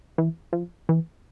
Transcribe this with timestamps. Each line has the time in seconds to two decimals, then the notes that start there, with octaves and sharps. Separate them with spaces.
0.18 E3
0.53 F3
0.89 E3